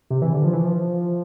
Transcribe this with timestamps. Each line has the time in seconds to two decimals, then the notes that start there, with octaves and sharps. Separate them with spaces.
0.10 C3
0.22 E3
0.33 D3
0.44 F3
0.53 E3
0.62 F3